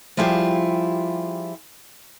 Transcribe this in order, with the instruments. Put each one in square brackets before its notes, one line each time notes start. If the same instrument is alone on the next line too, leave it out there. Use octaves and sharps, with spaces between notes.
[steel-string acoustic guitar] F3 G3 E4 F4 G4 G#4